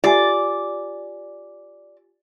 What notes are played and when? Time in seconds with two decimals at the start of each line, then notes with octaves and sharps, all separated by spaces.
0.04 F4 G4 D5 G#5